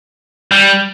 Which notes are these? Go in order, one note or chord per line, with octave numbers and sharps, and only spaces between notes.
G3